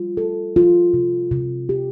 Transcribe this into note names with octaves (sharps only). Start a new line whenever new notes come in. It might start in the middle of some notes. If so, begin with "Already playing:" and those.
Already playing: G3 F4
A4
F4
C3
C3
G4